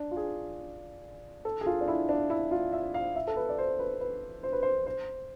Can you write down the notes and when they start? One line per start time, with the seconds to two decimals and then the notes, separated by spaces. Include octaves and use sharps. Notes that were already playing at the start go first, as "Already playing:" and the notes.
Already playing: D4
0.11 F4
0.17 G#4
1.45 A4
1.61 G#4
1.66 F4
1.81 D4
1.88 E4
2.09 D4
2.30 E4
2.51 F4
2.73 E5
2.94 F5
3.15 E5
3.27 A4
3.36 B4
3.49 D5
3.58 C5
3.79 B4
4.00 B4
4.43 C5
4.52 B4
4.62 C5
4.86 C5